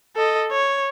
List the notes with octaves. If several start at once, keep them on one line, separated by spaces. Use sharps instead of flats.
A4 D#5
C#5